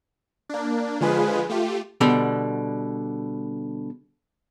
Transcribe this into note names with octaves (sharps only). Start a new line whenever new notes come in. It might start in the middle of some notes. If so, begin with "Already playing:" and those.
A#3 D4
D3 F3 G#3 F4 G#4 B4
A3 F4 G4
B2 D3 G3